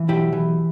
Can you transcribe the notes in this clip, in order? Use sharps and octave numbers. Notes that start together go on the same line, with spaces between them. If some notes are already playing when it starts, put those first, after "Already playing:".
Already playing: E3
B1 E4 G4
E3